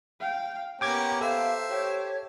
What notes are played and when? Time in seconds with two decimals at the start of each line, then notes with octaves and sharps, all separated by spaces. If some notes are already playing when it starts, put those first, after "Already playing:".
0.20 F5 G5
0.81 A#3 B3 C#4 G4 A#4 G5 D6 G#6
1.21 A4 C5 E5 F5
1.69 G4 C#5